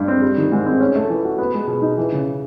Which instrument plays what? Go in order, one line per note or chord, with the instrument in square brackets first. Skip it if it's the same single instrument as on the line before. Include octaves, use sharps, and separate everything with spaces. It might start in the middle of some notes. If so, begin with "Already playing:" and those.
Already playing: [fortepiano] G2
C4
G3
D#3
G#2
C4
C#4
A3
E3
F#4
B3
G#3
B2
D#4
E3
C#3